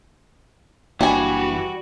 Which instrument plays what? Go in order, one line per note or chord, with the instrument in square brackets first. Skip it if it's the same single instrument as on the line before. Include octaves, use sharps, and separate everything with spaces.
[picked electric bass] F#1 A#3 D4 [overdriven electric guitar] E3 [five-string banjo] G3 G#5 [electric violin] F#4